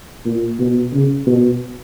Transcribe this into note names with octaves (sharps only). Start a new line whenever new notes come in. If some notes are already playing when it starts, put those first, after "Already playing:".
A#2
B2
C#3
B2